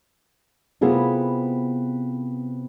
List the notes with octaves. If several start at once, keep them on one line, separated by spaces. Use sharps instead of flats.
C3 B3 E4 F4 G#4 A#4